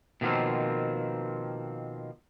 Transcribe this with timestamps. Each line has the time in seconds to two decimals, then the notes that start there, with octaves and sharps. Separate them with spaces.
0.21 B2 D#3 F3 G3 A#3 C4